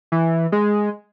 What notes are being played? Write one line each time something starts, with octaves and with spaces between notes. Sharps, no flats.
E3
G#3